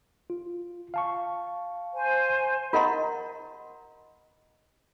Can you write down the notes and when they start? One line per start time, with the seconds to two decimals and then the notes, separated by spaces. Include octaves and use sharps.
0.30 F4
0.94 F5 A5 C#6
1.94 C5 G#5
2.73 F4 A#4 D#5 F#5 A#5 C6